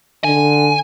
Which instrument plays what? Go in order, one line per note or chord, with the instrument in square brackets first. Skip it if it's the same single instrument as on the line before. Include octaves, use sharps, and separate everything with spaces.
[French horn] D3 [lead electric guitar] G#5